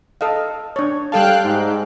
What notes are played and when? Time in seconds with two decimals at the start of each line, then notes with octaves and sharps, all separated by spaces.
0.21 A4 D#5 F5
0.76 D4 C#5
1.12 G3 A4 F5 G5 A5 F#6
1.44 G#2